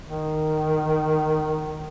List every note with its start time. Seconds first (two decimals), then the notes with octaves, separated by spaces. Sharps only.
0.08 D#3